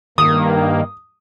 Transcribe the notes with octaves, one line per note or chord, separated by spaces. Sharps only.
G2 D#3 A#3 D#6